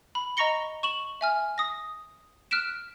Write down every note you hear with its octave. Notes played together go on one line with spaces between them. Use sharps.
B5
D#5 A#5 C#6 A#6 C#7 G7
C#6 E7 F#7
E5 G#5 F6
D#6 A#6
F6 F#6 B6 D7 E7